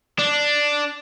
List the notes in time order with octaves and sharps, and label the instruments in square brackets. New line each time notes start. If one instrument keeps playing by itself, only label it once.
[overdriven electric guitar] D4